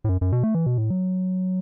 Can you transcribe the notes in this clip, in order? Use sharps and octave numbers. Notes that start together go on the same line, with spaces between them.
A2
F#2
F#2
B2
A3
E3
B2
A2
F#3